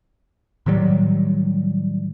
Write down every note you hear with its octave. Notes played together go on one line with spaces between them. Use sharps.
A2 D#3 F#3 G3